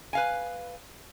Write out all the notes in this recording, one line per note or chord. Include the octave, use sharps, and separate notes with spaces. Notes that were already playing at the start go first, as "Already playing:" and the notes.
B4 F5 G#5